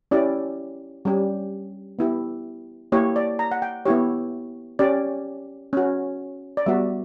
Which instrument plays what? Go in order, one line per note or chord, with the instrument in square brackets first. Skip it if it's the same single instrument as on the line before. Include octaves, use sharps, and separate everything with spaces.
[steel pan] C#4 E4 G4 D5
G3 C#4 G4
B3 E4 G4
A#3 E4 G4 C#5
D5
A#5
F#5
G5
B3 E4 G4 C#5
C#4 G4 D5
C#4 F#4
D5
G3 B3 F#4 E5